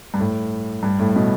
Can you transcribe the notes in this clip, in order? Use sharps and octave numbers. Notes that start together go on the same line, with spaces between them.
G2
A2
G2
A2
B2